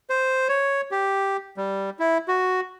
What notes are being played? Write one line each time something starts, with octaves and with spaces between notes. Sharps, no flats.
C5
C#5
G4
G3
E4
F#4